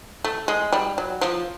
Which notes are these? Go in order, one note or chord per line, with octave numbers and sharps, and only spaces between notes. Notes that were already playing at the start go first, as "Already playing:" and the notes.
A3
G#3
G3
F#3
F3